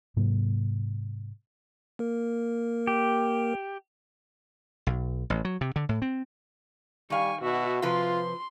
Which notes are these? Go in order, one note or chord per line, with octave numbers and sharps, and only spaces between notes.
G#2 C3 F#3 A#3
A#3 A#4
G4
B1
A1
F#3
C3
D3
A2
C4
D#3 G3 F5 G#5 C#6
B2 F#4 E5
C3 F3 F4 B4 C6